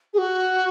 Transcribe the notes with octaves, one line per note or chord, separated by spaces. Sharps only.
G#4
F#4